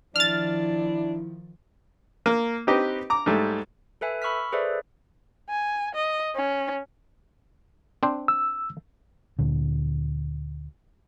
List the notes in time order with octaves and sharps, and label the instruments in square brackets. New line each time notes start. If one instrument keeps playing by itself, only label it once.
[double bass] D#3 F3 [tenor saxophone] D4 [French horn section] E4 [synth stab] F6 A6
[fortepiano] A#3
C4 D#4 G4 B4 D#5
A#5 D6
G#2 G3 A3
[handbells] A4 B4 E5 G#5
B5 C#6 E6 F6 B6
G#4 A4 B4 C5 D5 E5
[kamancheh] G#5
D#5
C#4
[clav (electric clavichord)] C4 D4 C5
[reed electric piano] E6
[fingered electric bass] D2 A#2 D3